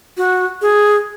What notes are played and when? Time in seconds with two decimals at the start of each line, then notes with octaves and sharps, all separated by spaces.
0.17 F#4
0.62 G#4